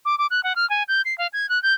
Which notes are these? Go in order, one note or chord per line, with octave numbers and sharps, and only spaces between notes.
D6
D6
F#6
F#5
F6
G#5
G6
C7
F5
G#6
F#6
G6